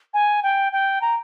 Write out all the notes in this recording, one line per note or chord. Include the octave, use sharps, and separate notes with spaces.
G#5
G5
G5
A#5